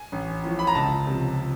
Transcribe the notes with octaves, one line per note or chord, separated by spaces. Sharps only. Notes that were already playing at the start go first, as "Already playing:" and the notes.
Already playing: G#5
A1
A2 F3
B5
A#5
C#2 A5
C3 F3